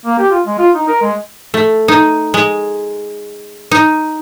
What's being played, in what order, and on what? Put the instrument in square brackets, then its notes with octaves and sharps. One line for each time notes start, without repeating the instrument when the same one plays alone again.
[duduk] A#3
G4
F4
G#3
F4
D#4
A#4
G#3
[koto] A3
D#4
G#3
D#4